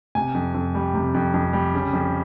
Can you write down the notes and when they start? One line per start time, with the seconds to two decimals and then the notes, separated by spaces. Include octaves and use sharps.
0.15 C3 G#5
0.35 F2
0.54 F2
0.75 G3
0.94 C3
1.14 F2
1.34 F2
1.53 G3
1.74 C#3
1.93 F2